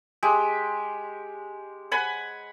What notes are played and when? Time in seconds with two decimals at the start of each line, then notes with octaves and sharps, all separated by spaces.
0.23 G#3 G4
1.91 F#5 G#5 B5